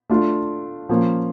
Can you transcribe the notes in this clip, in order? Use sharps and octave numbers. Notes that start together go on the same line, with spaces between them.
A3 D4 F4
F3 A#3 C#4